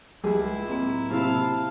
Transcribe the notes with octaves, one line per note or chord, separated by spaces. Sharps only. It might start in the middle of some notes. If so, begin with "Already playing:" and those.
C#2 G3 E4 G#4
D1 A#3 C4
C3 E4 F5 A5 B5